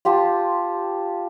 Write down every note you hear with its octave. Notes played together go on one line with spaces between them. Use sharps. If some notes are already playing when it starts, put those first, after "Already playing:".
F4 G4 C5 A5